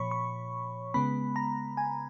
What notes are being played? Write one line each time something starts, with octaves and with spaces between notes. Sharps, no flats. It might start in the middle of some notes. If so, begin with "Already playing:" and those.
Already playing: A#2 F3 C#5 B5 C#6
C#6
C#3 G#3 B3 B5
A#5
G#5